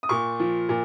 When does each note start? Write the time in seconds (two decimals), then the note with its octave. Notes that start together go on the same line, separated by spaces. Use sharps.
0.03 D#6
0.09 A#2 C#6
0.40 F3
0.69 A#2